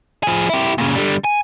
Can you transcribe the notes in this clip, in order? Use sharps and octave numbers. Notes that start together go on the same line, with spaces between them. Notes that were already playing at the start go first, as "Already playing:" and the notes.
F3 G#4
E4 G4
A#2 C#3
D3 G3
G#5